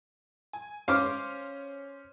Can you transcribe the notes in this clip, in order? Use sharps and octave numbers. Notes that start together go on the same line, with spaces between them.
G#5
C#4 C5 F5 D6 F6